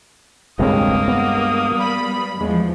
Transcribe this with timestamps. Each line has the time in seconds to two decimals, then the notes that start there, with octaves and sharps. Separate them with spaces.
0.59 E1 C#2 G2 G#3 A#3 C4 C#5 D#6
1.08 B3
1.76 G3 B5
2.41 E2 F3 G#3